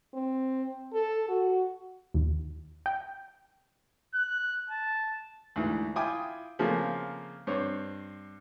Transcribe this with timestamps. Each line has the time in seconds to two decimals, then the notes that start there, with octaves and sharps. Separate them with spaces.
0.13 C4
0.93 A4
1.29 F#4
2.14 D#2
2.86 G5
4.15 F#6
4.70 A5
5.56 D2 G#2 E3
5.96 E4 F4 G5 G#5 D6 D#6
6.59 C#3 F3 A3 A#3 C4
7.47 G2 C4 C#5